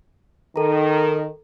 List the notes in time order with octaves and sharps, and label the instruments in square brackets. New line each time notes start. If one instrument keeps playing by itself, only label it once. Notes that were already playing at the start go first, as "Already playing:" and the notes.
[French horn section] D#3 [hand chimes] A4 A#5